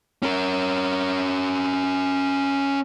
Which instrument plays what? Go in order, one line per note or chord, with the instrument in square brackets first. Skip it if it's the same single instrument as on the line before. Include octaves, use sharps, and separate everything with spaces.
[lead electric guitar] C#4 A#4